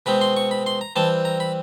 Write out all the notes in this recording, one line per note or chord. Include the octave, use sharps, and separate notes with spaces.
B2 G#3 C4 B5
C6
C#6
B5
C6
A#5
E3 G3 C4 A5
A#5
B5